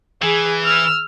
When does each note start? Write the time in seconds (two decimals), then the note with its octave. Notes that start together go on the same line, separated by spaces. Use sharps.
0.22 E3 G#4
0.65 E6 F6